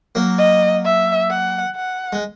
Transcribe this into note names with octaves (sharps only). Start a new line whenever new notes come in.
F#3 A#3
D#5
E5
F#5
F#5
G#3